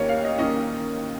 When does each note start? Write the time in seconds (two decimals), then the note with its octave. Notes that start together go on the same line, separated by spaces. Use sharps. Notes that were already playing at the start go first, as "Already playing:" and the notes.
Already playing: D#2 D#3 A#3 C#4 C#5
0.09 F5
0.24 D#5
0.38 D#3 A#3 C#4 D#5